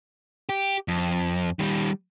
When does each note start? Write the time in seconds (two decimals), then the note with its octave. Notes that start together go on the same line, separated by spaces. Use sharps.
0.49 G4
0.88 F2
1.59 D#3 G3